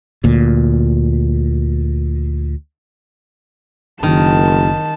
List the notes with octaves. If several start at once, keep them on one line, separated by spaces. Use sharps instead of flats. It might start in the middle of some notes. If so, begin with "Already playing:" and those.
D2 A#2
F#1 D#3 A5